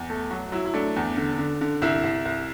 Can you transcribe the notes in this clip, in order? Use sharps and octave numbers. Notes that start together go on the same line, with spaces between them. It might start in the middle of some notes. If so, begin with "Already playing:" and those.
Already playing: E2
A3
F#3 F#4
F#3 E4
E4
A3 D4
E2
D3
D3
D3
C2 E4
C2
C2